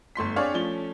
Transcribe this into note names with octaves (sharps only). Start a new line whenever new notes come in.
G1 A3 C6 B6
C4 D4 G#4 C#5 D5 F5
F3 A3 C#4 G7